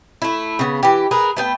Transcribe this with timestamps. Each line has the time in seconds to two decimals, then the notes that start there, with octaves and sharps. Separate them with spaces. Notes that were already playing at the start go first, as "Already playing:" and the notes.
0.22 A3 E4
0.59 C#3 B3
0.83 E3 G4
1.11 G#4 A#4 B4
1.37 A3 B3 G5